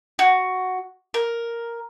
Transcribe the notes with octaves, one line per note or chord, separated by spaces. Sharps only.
F#4
A#4